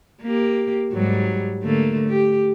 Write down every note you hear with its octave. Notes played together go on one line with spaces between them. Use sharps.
A#3 G4
G#2 F#3 G3
D3 A3 A#3
G4